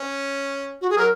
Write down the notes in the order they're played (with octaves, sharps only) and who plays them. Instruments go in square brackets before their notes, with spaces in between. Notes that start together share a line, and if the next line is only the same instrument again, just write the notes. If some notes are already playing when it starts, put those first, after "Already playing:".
Already playing: [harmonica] C#4
[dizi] F#4
G#4
[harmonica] F#3 [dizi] A#4